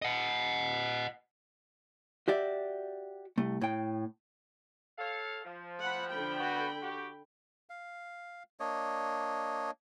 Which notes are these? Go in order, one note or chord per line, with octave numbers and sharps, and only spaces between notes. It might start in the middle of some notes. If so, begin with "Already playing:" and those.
D#5 F#5
F#4 G4 D5 E5
C2 A3
A2 G5
A4 C#5 F5
F3
F#5 B5
D3 G5 B5
B3 F#4
F#4 G4
F5
A#3 D4 C#5 D#5